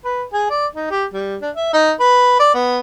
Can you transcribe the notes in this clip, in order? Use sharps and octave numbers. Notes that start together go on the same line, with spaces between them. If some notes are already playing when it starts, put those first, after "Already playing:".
B4
G#4
D5
D#4
G4
G3
D4
E5
D#4
B4
D5
B3